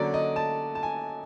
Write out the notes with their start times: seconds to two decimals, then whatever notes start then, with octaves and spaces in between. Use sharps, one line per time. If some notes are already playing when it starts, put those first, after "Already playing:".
Already playing: D3 F#3 A#3 C#4 D5
0.14 D#5
0.36 A5
0.75 A5
0.83 G#5